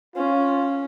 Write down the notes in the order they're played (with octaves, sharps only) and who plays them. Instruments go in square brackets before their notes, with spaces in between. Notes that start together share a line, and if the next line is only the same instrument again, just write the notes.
[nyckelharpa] C#4 [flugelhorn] F4